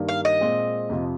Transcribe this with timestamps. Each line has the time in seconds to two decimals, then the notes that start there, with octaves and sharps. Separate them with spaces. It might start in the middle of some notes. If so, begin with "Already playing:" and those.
Already playing: G2 D#3 G3 A#3
0.09 F5
0.25 D#5
0.41 A#2 G#3 C4
0.90 F2 C3 F3